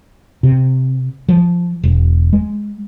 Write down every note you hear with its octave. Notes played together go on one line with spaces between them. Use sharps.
C3
F3
E1
G#3